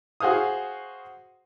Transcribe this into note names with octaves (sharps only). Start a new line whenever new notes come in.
F#4 G#4 C5 F5 D#6